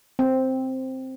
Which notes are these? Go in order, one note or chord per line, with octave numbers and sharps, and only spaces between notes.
C4